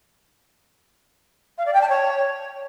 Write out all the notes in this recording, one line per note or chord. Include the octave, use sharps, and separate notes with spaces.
F5
D5
G5
A5
C#5